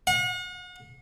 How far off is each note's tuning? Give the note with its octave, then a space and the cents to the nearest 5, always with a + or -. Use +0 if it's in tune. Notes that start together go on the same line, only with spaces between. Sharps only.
F#5 -45